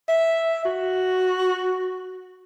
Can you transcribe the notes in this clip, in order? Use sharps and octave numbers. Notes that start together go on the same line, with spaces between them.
E5
F#4